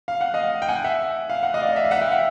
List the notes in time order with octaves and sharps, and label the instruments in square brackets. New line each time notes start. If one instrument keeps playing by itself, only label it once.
[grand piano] F5
F#5
D#5 F5
G5
F#5 G#5
E5 F#5
F5
F#5
D#5 F5
D5
D#5
E5
F5
E5 F#5
F5 G5
E5 F#5